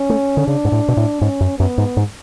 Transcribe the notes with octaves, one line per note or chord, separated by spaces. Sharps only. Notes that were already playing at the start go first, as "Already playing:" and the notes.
Already playing: C#4
A3
D3
C#3 D4
G#2
A2
B2
A2
G#2 C#4
F#2
F#2 B3
G#2
G#2